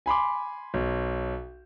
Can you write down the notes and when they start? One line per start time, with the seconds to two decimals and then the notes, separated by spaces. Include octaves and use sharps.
0.06 G#5 B5 C6 D6
0.74 B1